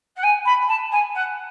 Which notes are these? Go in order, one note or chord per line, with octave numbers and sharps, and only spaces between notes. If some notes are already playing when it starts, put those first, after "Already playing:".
F#5
G#5
B5
A5
G#5
F#5